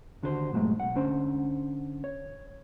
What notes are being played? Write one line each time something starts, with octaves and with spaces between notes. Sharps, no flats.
D#2 D3 F#4 A4 C5
G2 A#2 F#3 G#3 A3
B1 F#5
D3 C#4 C5
C#5